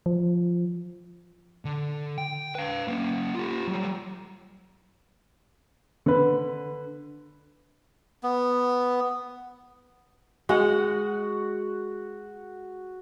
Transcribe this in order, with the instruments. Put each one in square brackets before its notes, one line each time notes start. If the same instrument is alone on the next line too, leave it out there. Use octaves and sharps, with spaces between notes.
[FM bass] F3
[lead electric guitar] D3
G5
B4 F5
A#3 C#4
F4 G4
F#3 G3
[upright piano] D3 B4
[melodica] B3
[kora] G#3 F#5 [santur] F#4